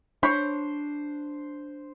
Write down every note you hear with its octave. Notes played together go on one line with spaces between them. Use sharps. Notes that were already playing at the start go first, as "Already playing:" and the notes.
D4 C5 C#5 B5